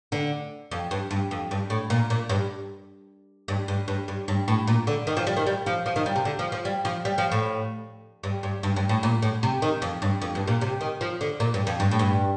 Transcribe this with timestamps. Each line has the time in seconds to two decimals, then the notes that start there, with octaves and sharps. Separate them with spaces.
0.12 D3
0.71 F2
0.91 G2
1.11 G2
1.31 F2
1.51 G2
1.70 A2
1.90 A#2
2.10 A#2
2.29 G2
3.48 G2
3.68 G2
3.88 G2
4.08 G2
4.28 G2
4.48 A2
4.67 A#2
4.87 D3
5.07 D#3
5.17 F3
5.27 G3
5.37 D#3
5.47 G3
5.66 F3
5.86 F3
5.96 D#3
6.06 G3
6.16 C3
6.25 D3
6.39 F3
6.52 F3
6.65 G3
6.85 F3
7.05 G3
7.18 F3
7.32 A2
8.23 G2
8.43 G2
8.63 G2
8.76 G2
8.89 A2
9.03 A#2
9.22 A2
9.43 C3
9.62 D#3
9.82 F2
10.02 G2
10.22 F2
10.35 G2
10.47 A#2
10.61 C3
10.81 D#3
11.01 F3
11.21 D3
11.40 A#2
11.54 G2
11.67 F2
11.80 G2
11.91 A2
11.99 G2